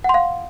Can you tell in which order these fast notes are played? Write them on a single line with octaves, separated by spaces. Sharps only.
F#5 C6 F5